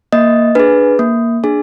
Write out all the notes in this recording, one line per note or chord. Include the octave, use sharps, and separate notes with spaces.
A#3 D#5
D4 G#4 B4
A#3
D4 G#4